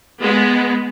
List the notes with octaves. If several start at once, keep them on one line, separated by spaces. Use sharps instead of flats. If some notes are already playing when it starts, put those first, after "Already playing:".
G#3 B3